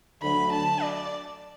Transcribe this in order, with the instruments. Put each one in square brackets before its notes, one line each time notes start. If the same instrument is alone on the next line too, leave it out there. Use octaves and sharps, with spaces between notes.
[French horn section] D2 D3 F#3 [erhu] B5
[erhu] A5
D5